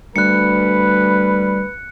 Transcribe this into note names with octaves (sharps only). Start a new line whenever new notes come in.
D2 G3 B4 F#6 C#7